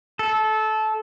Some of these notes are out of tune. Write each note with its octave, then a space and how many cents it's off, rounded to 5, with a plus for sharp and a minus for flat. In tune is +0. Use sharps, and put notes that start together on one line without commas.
A4 -20